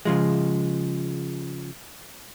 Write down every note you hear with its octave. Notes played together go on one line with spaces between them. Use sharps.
C#3 F3 G#3